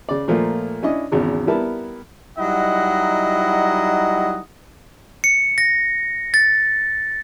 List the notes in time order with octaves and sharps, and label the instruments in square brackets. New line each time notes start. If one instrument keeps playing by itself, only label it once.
[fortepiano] C#3 D5
A#2 F3 A3 A#3 F4
C#4 D4 E4 D#5
G#1 E2 C#3 G#3
G3 B3 E4 A#4 A5
[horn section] F#3 G3 D#4 E4 D#5 F#5
[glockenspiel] C#7
A#6
A6